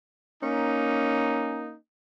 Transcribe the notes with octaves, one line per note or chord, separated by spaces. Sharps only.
A#3 C#4 D#4